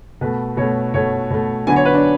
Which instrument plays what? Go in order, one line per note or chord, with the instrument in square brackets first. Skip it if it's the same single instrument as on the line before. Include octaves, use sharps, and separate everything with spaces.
[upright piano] B2 A3 B4
B2 A3 C#5
B2 A3 C#5
B2 A3
D3 F#3 B3 G#5
C#5
B4
D4